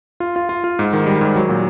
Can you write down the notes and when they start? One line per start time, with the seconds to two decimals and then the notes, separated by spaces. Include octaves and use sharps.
0.20 F4
0.36 F4
0.49 F4
0.64 F4
0.79 G#2
0.93 D#3
1.07 G3
1.21 G#2
1.36 F#3
1.49 A#2